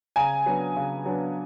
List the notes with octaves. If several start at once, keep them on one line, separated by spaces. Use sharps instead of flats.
C#3 G#5 A#5
F#3 B3 D4
C#3
F#3 B3 D4